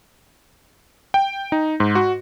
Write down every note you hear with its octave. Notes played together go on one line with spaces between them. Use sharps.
G5
D#4
G#2
F#4